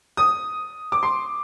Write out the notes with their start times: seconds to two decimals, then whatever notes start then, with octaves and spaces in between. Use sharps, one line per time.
0.17 D#6
0.92 D6
1.03 C6